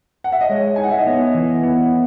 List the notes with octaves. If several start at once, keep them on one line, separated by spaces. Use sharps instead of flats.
F#5
E5
D#5
G#3 C#5
D#4 G#5
F#5
E5
D#5
B3 C#5
E3
B3